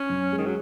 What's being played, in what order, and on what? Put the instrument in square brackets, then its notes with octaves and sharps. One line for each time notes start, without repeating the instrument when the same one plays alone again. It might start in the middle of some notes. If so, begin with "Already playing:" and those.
Already playing: [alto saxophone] C#4
[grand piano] F#2
G#3
[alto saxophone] D#3
F#3